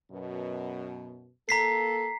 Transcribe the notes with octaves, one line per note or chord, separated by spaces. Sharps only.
F#2 B2
A#3 A4 A#5 B6 C7